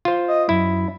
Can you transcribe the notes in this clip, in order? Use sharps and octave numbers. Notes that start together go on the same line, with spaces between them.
F4 C5
D#5
F#2 E4